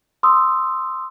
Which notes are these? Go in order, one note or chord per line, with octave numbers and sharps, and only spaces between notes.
C6 D#6 E6